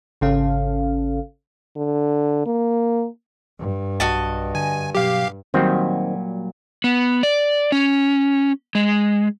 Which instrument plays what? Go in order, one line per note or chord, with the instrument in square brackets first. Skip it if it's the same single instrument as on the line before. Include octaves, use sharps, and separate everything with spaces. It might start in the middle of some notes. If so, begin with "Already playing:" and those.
[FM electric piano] G#1 C#3 C#4 A4 F5
[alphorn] D3
A#3
[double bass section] G2
[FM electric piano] B1 [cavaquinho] F#4 D#5 A5
[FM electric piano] D3 [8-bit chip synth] G#5
[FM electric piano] B2 F#3 [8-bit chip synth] G4 F5
[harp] A#2 F#3 G3 [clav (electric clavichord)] D#3 C4
[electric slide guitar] B3
D5
C#4
G#3